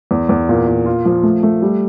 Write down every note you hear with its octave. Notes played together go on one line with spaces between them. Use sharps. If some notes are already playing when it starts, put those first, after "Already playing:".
E2
E2
A#2
A#2
F4
F3
A3
A3
G3